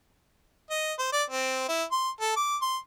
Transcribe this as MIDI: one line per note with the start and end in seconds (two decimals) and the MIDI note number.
0.70 0.93 75
0.99 1.11 72
1.12 1.23 74
1.30 1.65 60
1.69 1.83 64
1.92 2.10 84
2.21 2.34 69
2.36 2.56 86
2.62 2.77 84